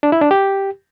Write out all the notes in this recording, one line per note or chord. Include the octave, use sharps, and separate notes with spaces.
D4
E4
D4
G4